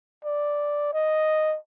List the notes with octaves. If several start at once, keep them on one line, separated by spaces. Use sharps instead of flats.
D5
D#5